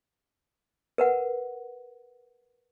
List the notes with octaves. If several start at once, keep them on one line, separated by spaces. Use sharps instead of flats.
A#4 B4 F#5